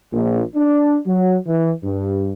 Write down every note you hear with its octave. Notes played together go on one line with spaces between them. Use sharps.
A#1
D4
F#3
E3
G2